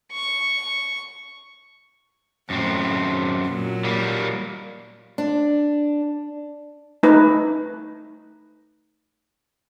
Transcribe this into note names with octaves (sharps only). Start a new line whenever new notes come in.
C#6
F#2 A2 C4
A#2 F#3
G3 A#3
D4
A3 D#4 B4